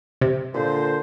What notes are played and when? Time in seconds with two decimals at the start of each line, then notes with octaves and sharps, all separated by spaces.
0.22 C3
0.54 A#2 D3 C5